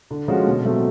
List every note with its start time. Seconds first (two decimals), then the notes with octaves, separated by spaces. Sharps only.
0.11 D3
0.28 F3 G#3 C#4 F#4
0.47 B2
0.65 F#3 A3 C4